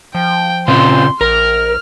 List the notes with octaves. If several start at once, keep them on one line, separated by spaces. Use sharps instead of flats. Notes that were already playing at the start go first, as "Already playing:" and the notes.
F3 G5
A#2 C#3 C4 F4 C6
A#1 A#4 F6